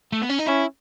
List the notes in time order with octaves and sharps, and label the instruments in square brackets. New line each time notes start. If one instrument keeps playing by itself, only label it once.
[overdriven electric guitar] A3
B3
C#4
D#4
[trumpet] C#4 [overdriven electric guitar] E4